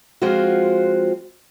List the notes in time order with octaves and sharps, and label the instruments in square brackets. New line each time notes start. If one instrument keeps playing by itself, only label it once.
[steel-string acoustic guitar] F3 G#3 C4 F4 F#4